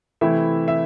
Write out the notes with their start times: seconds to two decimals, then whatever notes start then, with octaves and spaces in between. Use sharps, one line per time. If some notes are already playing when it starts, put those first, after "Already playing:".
0.21 C3 E3 A3 C4 E4 E5
0.68 E5